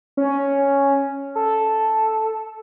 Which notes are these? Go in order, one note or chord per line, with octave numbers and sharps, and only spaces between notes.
C#4
A4